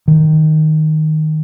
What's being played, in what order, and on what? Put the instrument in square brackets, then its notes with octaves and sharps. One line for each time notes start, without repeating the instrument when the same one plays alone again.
[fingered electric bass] D#3